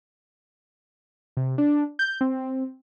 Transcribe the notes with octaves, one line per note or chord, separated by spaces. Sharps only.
C3
D4
G6
C4